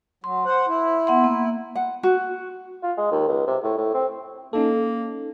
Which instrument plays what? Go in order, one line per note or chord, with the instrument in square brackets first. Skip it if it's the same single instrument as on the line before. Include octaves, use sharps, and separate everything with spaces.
[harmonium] F#3 [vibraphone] C6
[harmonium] C5 F#5
E4
[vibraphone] B3 F#5 C6
A#3
[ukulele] F#5
F#4
[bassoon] F4
G#3
D#2
C#2
C3
A2
A2
C4
[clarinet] A#3 [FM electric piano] C#4 D#4 A4